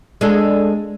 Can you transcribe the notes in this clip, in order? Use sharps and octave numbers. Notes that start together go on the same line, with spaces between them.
G#3 D4 A4